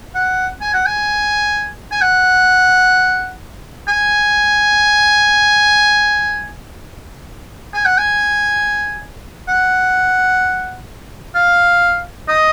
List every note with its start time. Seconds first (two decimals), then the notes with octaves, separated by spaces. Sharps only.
0.15 F#5
0.61 G#5
0.74 F#5
0.86 G#5
1.92 G#5
2.02 F#5
3.88 G#5
7.74 G#5
7.85 F#5
7.98 G#5
9.49 F#5
11.35 F5
12.29 D#5